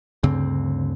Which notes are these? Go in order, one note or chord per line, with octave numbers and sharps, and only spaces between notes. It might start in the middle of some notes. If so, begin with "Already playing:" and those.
D2 G2 C#3 C4